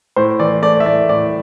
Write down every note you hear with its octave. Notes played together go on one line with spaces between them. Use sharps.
A2 C5
E3 D5
A3 D5
E5
A2 D5
A2 D5